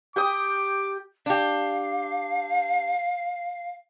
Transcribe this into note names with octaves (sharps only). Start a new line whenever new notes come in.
G4 G5 D6 D#6
D4 G4 F5